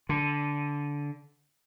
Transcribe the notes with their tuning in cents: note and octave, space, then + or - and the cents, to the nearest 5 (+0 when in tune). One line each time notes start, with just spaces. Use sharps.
D3 -15